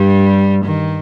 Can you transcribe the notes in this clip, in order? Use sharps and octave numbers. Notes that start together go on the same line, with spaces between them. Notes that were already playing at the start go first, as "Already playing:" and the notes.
Already playing: G2 G3
D#3